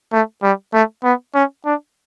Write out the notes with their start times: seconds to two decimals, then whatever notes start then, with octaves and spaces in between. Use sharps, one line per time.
0.13 A3
0.43 G3
0.73 A3
1.04 B3
1.35 C#4
1.65 D4